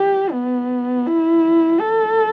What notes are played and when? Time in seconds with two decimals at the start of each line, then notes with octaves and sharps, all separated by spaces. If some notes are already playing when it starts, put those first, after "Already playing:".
Already playing: G4
0.32 B3
1.06 E4
1.80 A4